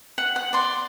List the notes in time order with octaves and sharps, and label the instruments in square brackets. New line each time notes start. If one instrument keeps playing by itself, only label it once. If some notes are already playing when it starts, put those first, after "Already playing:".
[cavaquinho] F#5
F#5
D5 C6